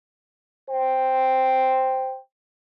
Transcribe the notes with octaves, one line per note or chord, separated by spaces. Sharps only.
C5 G5